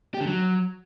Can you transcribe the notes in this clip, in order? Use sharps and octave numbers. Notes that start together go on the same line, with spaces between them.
G4
D3
F#3